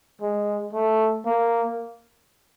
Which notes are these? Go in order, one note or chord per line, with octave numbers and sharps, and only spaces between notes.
G#3
A3
A#3